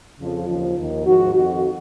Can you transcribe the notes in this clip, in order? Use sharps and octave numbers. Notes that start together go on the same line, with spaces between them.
F2 C#3 F3
D#2 C#3 F3
D#2 D#3
G#2 F3 F#4
F2 D#3 F#4